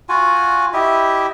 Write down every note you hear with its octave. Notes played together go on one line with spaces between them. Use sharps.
F4 F#4 F#5 G#5
E4 G4 D#5 E5